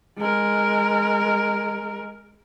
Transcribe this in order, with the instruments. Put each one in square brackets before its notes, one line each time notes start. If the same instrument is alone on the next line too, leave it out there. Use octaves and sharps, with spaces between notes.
[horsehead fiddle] G#3 A#4